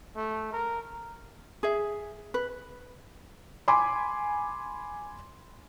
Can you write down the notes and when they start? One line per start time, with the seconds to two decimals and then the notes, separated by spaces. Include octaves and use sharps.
0.16 A3
0.52 A#4
1.63 G#4 E5
2.34 B4
3.68 G#5 B5 C6 D6